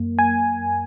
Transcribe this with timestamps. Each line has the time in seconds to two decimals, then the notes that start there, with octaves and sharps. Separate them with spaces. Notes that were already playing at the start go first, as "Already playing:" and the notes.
Already playing: F#2 A#3
0.19 G#5